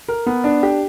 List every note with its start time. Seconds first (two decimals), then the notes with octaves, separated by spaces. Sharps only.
0.08 A#4
0.26 B3
0.44 D4
0.63 G4